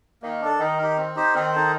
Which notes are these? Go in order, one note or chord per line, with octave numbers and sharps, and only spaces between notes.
D#3 A#3
D4 A4
D#3 D#4
G4 A#4
C4
D#4 G4 C5
D#3 C4
D#4 A4 C5